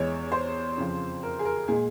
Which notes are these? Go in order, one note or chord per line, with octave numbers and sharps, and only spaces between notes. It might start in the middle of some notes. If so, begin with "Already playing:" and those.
Already playing: E2 E3 G#3 C#5
C5
F2 C#3 F3
A#4
G#4
A#4
A#2 G#3 G#4